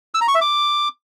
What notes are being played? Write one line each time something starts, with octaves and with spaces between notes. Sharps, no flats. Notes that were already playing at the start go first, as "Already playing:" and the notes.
E6
A#5
C#6
E5
D6